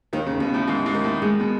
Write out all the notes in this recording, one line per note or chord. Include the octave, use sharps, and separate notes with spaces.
D#2 D#3
C#3
D#2 B2
A2
D#2 G#2
G#2
D#3
A2
A2 G#3
B2